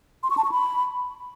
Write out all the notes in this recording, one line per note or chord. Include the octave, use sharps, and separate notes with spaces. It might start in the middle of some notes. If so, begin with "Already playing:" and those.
C6
C#6
A5
C#6
B5